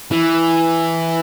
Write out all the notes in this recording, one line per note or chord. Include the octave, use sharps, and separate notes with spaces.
E3